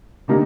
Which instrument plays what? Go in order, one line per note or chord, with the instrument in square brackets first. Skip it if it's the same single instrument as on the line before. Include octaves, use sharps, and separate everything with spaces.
[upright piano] D3 G3 A#3 D#4